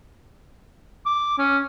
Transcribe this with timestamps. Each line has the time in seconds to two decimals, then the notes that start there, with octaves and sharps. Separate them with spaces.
1.06 D6
1.38 C#4